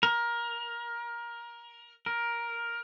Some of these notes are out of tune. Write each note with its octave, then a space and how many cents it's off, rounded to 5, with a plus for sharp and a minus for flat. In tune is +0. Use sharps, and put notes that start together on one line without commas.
A#4 +20
A#4 +10